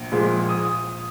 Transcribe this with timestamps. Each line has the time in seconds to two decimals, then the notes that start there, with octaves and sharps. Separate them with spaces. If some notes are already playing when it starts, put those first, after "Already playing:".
Already playing: A#1
0.12 A#2 F3 G#3
0.49 D#6